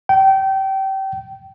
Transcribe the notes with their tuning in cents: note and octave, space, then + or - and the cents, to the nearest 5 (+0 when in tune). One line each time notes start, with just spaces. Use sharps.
G5 -25